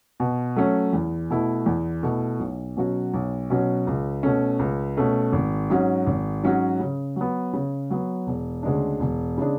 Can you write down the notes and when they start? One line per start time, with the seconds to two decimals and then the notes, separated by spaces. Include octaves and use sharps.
0.20 B2
0.56 F#3 A3 C#4
0.93 E2
1.30 B2 A3 E4
1.66 E2
2.03 B2 A3 E4
2.39 B1
2.77 B2 F#3 C#4 F#4
3.14 B1
3.50 B2 F#3 C#4 F#4
3.87 C#2
4.23 B2 A3 C#4
4.59 C#2
4.97 B2 A3 C#4
5.33 G#1
5.69 G#2 F#3 C#4 F#4
6.07 G#1
6.43 G#2 F#3 C#4 F#4
6.80 C#3
7.16 F#3 B3
7.53 C#3
7.90 F#3 B3
8.27 E1
8.63 D2 C#3 G#3 D4
9.00 E1
9.38 C#3 G#3 D4